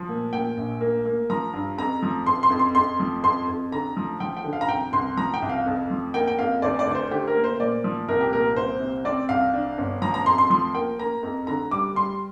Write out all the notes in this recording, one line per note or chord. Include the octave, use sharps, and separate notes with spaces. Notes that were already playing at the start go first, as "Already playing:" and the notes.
Already playing: F3
A#2
A#2 G5
A#1
A#3
A#3
F3 A#5
G2
F2 A#5
F3
F2 C6
C6
F2
C6
F2 C6
F3
F2 C6
F2
D3 A#5
F3
F3 G5
G5
D3
F5
A#5
C2 G5
C2 C6
F3 A#5
G5
C2
F5
F2
F3
A#3 G5
G5
F2 F5
D2 D5
D5
D2
C5
D3 G4
A#4
A#3
C5
A#2 D5
F3
C2 A#4
G4
A#2 A#4
C2 C5
C3
C4 D5
C2 F5
D4
G1
F3 A#5
A#5
F2 C6
C6
F3 C6
A#3 G5
A#3 A#5
F2
D3 A#5
G3 D6
G3 C6